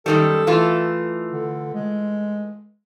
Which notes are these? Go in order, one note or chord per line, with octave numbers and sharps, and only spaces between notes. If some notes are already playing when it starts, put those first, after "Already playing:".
F#2 D#3 G3 A4
E3 A3 F4
D3
G#3